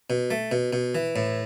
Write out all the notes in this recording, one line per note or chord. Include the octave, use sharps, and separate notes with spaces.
B2
A3
B2
B2
E3
A2